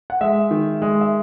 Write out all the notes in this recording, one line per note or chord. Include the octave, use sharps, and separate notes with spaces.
F#5
G#3 E5
D#3
G#3
E5